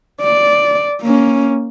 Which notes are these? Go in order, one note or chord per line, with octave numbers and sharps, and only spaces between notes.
D5
A#3 C#4